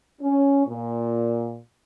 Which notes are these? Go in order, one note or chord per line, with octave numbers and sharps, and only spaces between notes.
C#4
A#2